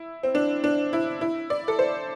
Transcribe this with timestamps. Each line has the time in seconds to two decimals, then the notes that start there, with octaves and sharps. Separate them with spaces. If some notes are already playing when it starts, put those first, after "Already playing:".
Already playing: E4
0.23 C4
0.35 D4
0.64 D4
0.93 E4
1.21 E4
1.50 D5
1.68 A4
1.79 C5